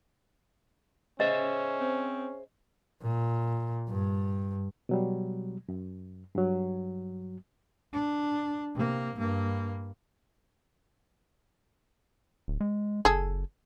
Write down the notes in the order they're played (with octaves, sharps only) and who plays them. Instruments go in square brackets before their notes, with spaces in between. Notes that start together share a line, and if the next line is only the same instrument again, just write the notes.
[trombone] C#4 [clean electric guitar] G#4 C5 E5 [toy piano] D#5
[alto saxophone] C4
[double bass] A#2
G2
[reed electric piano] B2 F#3 G3
F#2
G2 F#3
[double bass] D4
C3 A#3
G2 A#3
[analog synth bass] D1
G#3
[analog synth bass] F#1 [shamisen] G#4 A4